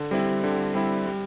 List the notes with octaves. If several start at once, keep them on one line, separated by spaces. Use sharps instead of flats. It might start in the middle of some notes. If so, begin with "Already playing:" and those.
Already playing: D3
G3 C4 E4
D3
G3 C4 E4
G3